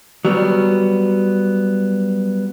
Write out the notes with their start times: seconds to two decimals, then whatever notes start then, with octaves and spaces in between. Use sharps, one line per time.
0.25 F#3 G3 B3